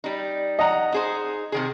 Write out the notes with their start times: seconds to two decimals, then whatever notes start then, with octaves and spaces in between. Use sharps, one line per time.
0.04 G3 D#4
0.59 D#5 F#5 A#5
0.92 D#4 G#4 C5
1.52 C3 D#3 G#4